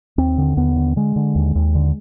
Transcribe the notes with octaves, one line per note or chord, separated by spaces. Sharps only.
D#2 C4
D3
D#2 B3
D3
D3 G#3
D3
D#2
D#2
D3